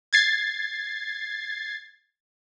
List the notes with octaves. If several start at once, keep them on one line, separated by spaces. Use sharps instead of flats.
G#6 A6 C7